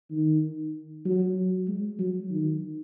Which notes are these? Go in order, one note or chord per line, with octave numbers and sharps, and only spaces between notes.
D#3
F#3
G#3
F#3
D#3